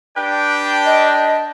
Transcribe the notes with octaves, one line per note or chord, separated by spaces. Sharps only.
D4 G4 B4 G5
D#5